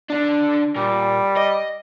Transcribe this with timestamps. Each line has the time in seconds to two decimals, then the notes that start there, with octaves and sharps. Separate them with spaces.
0.10 D3 D4
0.76 A#2 G3
1.37 D#5